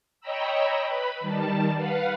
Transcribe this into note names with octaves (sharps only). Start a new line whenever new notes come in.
C#5 D#5 G5 A#5 B5 E6
B4 B5
D#3 G3 A5
B4 F5 F#5